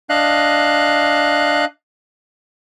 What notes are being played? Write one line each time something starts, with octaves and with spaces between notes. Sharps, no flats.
D4 D#5 F5 F#6